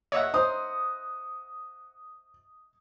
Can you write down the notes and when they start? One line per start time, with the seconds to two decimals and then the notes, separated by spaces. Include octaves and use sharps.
0.12 C#5 D#5 E5 F#5
0.34 D#4 C5 D#6